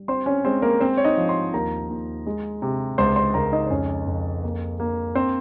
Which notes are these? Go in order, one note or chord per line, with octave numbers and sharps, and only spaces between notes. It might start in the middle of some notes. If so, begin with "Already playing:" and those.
Already playing: G3
C4 C5 C6
C#4 C#5
G#3 C4 C5
A#3 A#4
C4 C5
C#5
D#4 D#5
F3
C5 C6
D#2 A#4 A#5
D#2
G#3
C3
C#2 C5 C6
C5 C6
C#2 A#4 A#5
D#4 D#5
C5
F2 C#4 C#5
F2
A#3
A#3
C4 C5